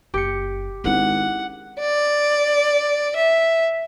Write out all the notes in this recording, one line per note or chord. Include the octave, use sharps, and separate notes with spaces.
F#1 G4 C#7
G#1 C#4 E4 F#5
D5
E5